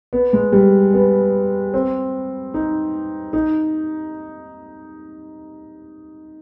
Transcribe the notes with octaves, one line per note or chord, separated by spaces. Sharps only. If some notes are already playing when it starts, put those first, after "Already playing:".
B3
G#3
G3
B3
C4
D#4
D#4